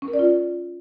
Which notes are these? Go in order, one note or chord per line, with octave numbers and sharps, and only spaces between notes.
C#4
A#4
D5
F4